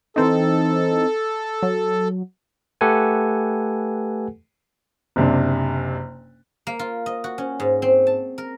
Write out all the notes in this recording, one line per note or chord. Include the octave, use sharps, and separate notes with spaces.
E3 C4 D#4 A4
F#3
A3 G4 A4 B4 F#5 G#5
F#1 C3 D4
A#3
F4
D#5
F#4
C#4
G#2
C4
A5
A#4